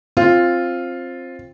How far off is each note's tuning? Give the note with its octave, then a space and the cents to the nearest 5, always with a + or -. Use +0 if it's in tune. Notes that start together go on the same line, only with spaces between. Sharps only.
C4 +15 F4 +0